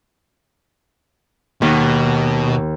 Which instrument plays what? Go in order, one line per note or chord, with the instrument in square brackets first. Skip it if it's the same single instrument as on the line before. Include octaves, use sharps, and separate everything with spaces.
[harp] D#2 [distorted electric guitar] B2